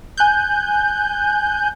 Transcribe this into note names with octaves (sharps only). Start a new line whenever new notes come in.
G#5 F#6 G6